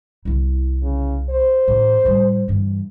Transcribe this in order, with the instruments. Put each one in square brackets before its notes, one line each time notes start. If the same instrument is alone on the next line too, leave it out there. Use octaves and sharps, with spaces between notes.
[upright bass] C2 E4
[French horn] C#3
C5
[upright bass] A2 E3
A2 G3
G2 E3